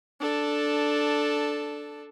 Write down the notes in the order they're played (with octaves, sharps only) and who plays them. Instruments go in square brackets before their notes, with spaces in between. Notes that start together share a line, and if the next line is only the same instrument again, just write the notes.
[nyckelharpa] D4 A4